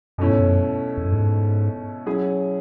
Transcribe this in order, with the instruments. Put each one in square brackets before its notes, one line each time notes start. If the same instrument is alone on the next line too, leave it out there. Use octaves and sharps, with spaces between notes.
[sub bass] F#2 [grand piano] B2 A3 C#4 E4
[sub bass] G#2
F#2
E2
F#2
G#2
[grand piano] F#3 C#4 E4 G#4